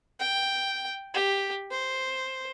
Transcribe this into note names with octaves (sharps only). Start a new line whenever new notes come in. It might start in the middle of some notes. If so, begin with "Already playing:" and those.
G5
G4
C5